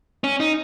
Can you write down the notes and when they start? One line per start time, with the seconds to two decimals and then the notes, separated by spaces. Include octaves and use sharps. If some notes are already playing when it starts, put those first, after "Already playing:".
0.24 C#4
0.40 D#4